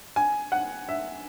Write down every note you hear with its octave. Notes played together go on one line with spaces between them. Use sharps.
G#5
F#5
E5